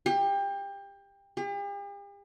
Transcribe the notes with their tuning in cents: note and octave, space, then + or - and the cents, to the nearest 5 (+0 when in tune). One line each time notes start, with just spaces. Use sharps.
G4 +25
G4 +45